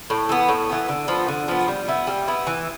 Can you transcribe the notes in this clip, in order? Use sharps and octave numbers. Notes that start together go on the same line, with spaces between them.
A2
E3 B3
A2
E3 B3
D3
F3 B3
D3
F3 B3
G3
B3 E4
G3
B3 E4
E3